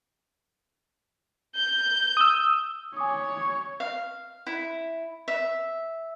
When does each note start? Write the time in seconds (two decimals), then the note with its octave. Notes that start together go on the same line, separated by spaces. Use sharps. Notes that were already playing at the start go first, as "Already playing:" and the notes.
1.56 G6
2.17 D#6 E6
2.97 C#5 G#5 D6 D#6
3.80 F5
4.47 E4
5.28 E5